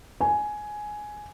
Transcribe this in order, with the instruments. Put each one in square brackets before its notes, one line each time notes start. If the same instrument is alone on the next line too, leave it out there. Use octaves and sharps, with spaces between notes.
[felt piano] G#5